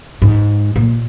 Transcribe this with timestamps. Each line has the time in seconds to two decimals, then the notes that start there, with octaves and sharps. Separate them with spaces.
0.22 G#2
0.76 A#2